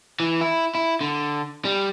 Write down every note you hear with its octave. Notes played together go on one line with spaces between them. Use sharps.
E3
E4
E4
D3
G3